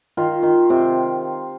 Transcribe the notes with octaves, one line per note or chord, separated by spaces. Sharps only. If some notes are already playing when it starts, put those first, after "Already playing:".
D#3 F4
D#3
C3